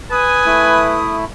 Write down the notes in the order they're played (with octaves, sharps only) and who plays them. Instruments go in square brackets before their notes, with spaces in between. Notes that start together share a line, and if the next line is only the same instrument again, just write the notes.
[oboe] B4 [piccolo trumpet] G#5 [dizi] D#6
[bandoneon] A3 E4